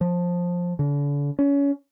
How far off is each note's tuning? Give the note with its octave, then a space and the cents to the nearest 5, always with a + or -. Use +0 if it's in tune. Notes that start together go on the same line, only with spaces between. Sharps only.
F3 +15
D3 -40
C#4 +25